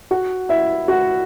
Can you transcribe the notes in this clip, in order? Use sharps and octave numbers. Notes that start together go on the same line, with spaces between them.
F#4 F#5
E4 E5
F#4 F#5